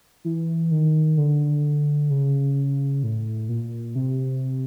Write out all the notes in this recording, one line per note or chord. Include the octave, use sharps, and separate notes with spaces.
E3
D#3
D3
C#3
A2
A#2
C3